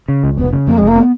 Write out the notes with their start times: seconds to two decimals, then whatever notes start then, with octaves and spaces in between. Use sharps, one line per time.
0.08 C#3
0.23 C#2
0.37 F1 B3
0.53 C#3
0.67 F2 A#3
0.77 F1 G#3
0.87 A#3
0.96 B3